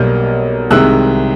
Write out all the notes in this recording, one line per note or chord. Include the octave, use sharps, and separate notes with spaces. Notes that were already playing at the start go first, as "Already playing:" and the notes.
Already playing: B1 B2 G3 A#3 F6 G6
C2 C3 D#3 G#3 E6 F#6